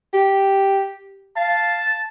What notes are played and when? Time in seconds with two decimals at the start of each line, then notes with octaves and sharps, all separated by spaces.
0.13 G4
1.37 F5 A5